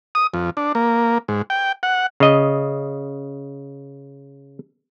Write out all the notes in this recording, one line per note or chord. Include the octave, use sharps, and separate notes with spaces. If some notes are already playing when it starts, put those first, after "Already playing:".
D#6
F2
D4
A#3
G#2
G5
F#5
C#3 D#5